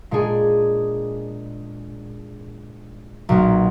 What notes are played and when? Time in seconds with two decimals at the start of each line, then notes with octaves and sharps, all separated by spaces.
0.11 A#2 G#3 D4 G#4
3.29 B1 A#2 F#3 A#3